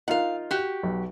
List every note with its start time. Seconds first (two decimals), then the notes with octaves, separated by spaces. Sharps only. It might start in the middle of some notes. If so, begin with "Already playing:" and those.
0.08 D#4 F4 A#4 F5 F#5
0.51 F#4 G4
0.83 B1